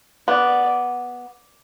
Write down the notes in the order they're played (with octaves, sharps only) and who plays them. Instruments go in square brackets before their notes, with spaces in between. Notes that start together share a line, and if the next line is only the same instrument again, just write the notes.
[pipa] B3 [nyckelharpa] D5